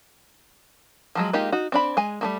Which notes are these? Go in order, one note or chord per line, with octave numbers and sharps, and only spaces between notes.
F3 F#3 G#3
G#3 A#3 D#4 F4 G4
D#4 F#4
C4 D4 B5
G#3 G#5
G3 A3 A#3